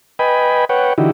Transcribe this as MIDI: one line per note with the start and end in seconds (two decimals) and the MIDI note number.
0.19 0.65 71
0.19 0.65 75
0.19 0.65 79
0.19 0.65 80
0.19 0.65 83
0.69 0.93 71
0.69 0.93 73
0.69 0.93 78
0.69 0.93 79
0.98 1.11 50
0.98 1.11 52
0.98 1.11 63
0.98 1.11 64
0.98 1.11 66
0.98 1.11 67